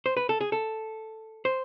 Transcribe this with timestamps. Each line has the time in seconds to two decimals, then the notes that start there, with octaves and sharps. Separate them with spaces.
0.06 C5
0.17 B4
0.29 A4
0.41 G#4
0.52 A4
1.45 C5